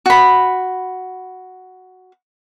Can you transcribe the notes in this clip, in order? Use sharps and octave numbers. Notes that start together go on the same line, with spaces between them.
F#4 B5